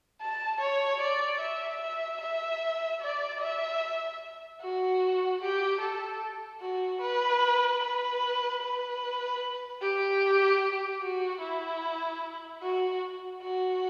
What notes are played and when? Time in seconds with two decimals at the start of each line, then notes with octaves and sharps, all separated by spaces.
0.21 A5
0.61 C#5
1.01 D5
1.41 E5
1.81 E5
2.21 E5
3.01 D5
3.41 E5
4.61 F#4
5.42 G4
5.81 A4
6.61 F#4
7.01 B4
7.82 B4
8.62 B4
9.82 G4
11.02 F#4
11.41 E4
12.62 F#4
13.42 F#4